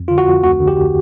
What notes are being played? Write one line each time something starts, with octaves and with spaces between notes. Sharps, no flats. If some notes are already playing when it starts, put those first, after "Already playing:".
Already playing: F2
D3 F4
F#4
F2
D2 F#4
D3
G4